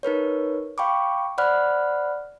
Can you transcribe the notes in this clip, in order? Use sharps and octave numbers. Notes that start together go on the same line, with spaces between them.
D#4 A#4 B4 C#5
F5 G5 B5 C#6 D6
C5 D5 F#5 B5 F6 F#6